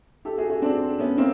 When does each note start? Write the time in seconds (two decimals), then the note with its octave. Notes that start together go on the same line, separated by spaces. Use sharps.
0.25 G4 A4
0.38 F#4 G#4
0.50 F#4 G#4
0.62 C4 D4
0.99 B3 C#4
1.18 A#3 C4